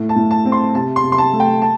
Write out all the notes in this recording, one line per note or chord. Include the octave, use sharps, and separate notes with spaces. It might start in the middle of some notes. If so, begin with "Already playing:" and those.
Already playing: A2
A5
A2
A5
C4
C6
C3 A5
C6
C3
C6
A5
A3
G5
A5